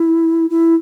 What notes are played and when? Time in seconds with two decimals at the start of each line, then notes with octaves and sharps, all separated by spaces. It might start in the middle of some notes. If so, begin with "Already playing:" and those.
Already playing: E4
0.50 E4